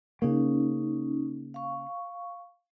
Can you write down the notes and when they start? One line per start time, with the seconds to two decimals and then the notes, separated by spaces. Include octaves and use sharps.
0.22 C#3 A#3 C#4 D#4
1.54 F5 C#6